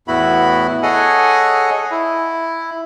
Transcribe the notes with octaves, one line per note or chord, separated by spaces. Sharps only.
E2 A2 B3 E4 F#4 B5
G#4 A4 C#5 D#5 F#5 G#5
E4